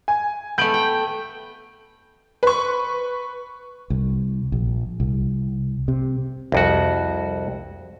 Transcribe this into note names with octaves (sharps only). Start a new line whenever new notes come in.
G#5
A3 B3 G6 D7 F#7
G5
B4 C#6
C2
A#1
C2
C3
C2 F2 F#4